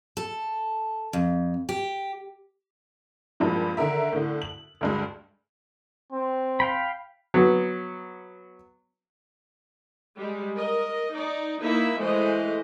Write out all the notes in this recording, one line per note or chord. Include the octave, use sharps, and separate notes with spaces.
A4
F2
G4
G2 A#2 F3 G#3
D3 D#3 A#4 E5
A2 D3
F#7
D2 G2 G#3
C4
F5 G5 B5
F#3 B3
G3 G#3
A#4 D#5
D#4 D5
A#3 D#4 E4 B4 E5
E3 G#3 A3 C5 D#5